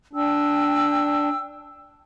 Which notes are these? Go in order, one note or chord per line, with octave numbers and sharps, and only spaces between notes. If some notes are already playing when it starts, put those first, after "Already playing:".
D4 G5 E6